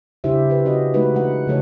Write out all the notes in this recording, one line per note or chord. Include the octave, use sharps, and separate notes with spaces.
C#3 D4 E4 G4 C5 E5
G4 B4
C#4 F#4 D#5
G#3 A3 D#4 F#4 B4
E3 G#3 D4 F#5
C#3 E3 A3 A4 C#5